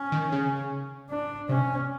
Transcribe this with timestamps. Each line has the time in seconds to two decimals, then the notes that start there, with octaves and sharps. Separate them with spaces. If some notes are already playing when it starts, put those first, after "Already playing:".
Already playing: C#4
0.12 D#3
0.32 C#3
1.10 D4
1.49 C3 C#4